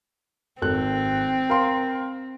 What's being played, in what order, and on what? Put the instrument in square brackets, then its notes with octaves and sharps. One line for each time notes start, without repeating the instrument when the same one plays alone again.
[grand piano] G#1 A4 F#6 [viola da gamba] C4
[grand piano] A#4 F5 C6